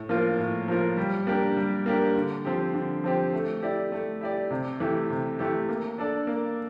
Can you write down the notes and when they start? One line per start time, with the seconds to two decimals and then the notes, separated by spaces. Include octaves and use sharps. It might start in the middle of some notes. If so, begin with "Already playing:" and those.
Already playing: A2
0.09 F3 A#3 F4 A#4
0.39 A2
0.68 F3 A#3 F4 A#4
0.97 G3
1.27 A#3 D4 G4 A#4
1.57 G3
1.86 A#3 D4 G4 A#4
2.16 D3
2.45 F3 C4 G4
2.74 D3
3.04 F3 C4 G4
3.33 A3
3.62 E4 G4 D5
3.92 A3
4.21 E4 G4 D5
4.50 C3
4.80 E3 A3 E4 G4
5.10 C3
5.39 E3 A3 E4 G4
5.69 A#3
5.98 D4 A4 D5
6.27 A#3